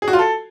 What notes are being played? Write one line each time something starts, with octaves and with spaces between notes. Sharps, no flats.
G#4
F#4
F4
A4